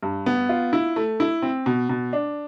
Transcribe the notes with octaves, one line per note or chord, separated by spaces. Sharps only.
G2
B3
F4
E4
A3
E4
C4
B2
B2
D4